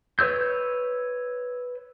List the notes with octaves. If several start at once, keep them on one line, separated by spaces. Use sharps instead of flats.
B4 C#5 E6 G6